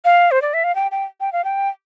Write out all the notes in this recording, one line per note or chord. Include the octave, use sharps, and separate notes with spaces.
F5
C5
D5
E5
F5
G5
G5
G5
F5
G5